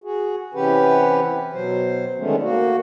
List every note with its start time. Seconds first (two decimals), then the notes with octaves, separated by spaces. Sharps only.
0.04 F#4 G#4
0.54 C3 E3 C#4 G4 B4 F#5
1.53 B2 F#3 C5
2.18 D3 D#3 G#3 A3 B3 C#4
2.42 A#3 F#4